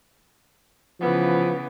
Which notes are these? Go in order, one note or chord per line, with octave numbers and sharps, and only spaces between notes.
C#3 E3 F3 B3